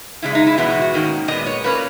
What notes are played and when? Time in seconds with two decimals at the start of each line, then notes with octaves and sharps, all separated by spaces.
0.22 F#2 C#3 G#3 E4
0.35 D#4
0.47 E4
0.57 E2 B2 G#3 B3 E4
0.70 F#4
0.82 F#4
0.94 G#2 D#3 A#3 C#4
1.28 A#2 G#3 B3 D#5
1.46 C#5
1.64 A#2 A#3 C#4 B4